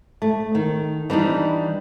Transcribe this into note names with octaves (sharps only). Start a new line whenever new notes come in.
A3
D#3
E3 G3 D4 D#4